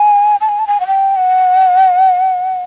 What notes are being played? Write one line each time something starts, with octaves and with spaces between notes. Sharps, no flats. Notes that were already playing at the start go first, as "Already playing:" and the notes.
Already playing: G#5
A5
G#5
A5
G#5
F#5
G5
F#5